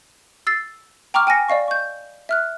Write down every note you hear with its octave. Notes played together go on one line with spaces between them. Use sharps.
E6 A6 C7
G5 A#5 C#6 D6 F6
G5 G#5 F6 A#6 C#7
D5 D#5 F5 C#6
C#6 G6
E5 F6 F#6